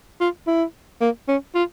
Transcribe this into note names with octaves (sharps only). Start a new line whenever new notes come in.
F4
E4
A#3
C#4
F4